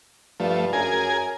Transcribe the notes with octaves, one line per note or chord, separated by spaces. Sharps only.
G2 F3 A3
F#2 G#4 A#4 G#5